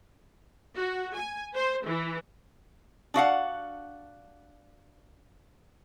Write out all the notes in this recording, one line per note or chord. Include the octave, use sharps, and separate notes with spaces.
F#4
G#5
C5
E3
D4 F#4 F5 F#5